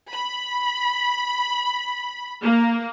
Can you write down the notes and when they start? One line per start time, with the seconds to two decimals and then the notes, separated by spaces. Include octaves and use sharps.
0.11 B5
2.42 A#3